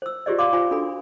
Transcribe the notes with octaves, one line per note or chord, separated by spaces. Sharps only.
C5 E6
F4 G4 G#4 C5 D5 D#5
D5 F5 C6 D6
F4 C5 G#5 B5
D4 F#4 A4 G#5 B5